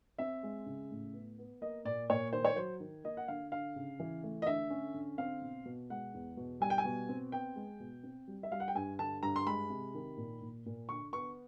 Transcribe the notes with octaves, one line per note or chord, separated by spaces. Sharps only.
C4 E5
G#3
C#3
A2
B3
B3
A#3 D#5
A#2 D5
A#2 C#5
D#3 C5
C#5
F#3 C5
D#3
A#3 D#5
F#5
D3 F5
D3 F5
C#3
E3
A3
D#5
D3 E5
C#4
D3
C4 F5
B2
B2
G#3 F#5
E2
B2
G3 G#5
G5
G#5
B2
C4
B3 G5
G#3
B2
C4
G3
E5
G3 F5
F#5
G5
G2 G#5
D3 A5
G2 A#5
C6
G#3 B5
C3
D#3
A#2
A#2
A#2
D3 C#6
B3 C#6